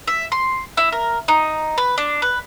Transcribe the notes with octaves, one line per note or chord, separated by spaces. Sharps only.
E5
C6
E4
A#4
D#4
B4
D4
B4